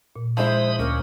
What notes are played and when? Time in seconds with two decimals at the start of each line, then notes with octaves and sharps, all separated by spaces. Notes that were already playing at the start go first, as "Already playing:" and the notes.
0.16 A#2
0.37 F3 G#3 E4 C5 B5 D#6
0.79 D2 A#3 C#4 A#4